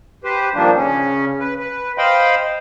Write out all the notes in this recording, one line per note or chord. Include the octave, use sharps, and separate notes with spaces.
G4 B4 C5
A#2 D#3 F3 G3 A#3 D4
C#3 C#4
B4
B4
C5 D#5 F5 G5 B5 C6